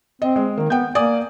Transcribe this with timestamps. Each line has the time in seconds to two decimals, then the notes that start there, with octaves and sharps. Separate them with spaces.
0.22 C4 D#5
0.36 G#3
0.58 D#3 A#3
0.70 B3 G5 G6
0.95 A#3 D5 G#5 D#6